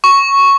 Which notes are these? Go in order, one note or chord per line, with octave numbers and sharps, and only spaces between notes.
C#6